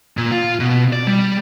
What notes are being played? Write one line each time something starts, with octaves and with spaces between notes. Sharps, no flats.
A#2
F4
B2
D5
G3